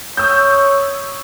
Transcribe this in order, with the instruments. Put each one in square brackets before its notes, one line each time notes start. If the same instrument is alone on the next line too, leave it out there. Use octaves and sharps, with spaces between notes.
[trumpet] C#5 [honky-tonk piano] D#6 E6 G6